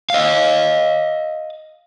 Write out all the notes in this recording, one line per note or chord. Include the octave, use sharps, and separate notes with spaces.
D#5 F5